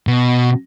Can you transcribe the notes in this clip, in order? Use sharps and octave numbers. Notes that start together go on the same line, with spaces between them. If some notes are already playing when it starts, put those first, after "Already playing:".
B2